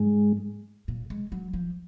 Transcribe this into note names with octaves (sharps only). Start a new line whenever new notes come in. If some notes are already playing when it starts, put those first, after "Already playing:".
Already playing: G#2 G#3
A#2
G#3
F#3
F3